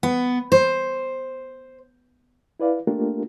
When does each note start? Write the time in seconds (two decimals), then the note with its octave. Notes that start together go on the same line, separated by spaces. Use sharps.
0.03 B3
0.52 C5
2.60 E4 B4 D5 F5
2.87 A3 A#3 D4 F4 G4 A#4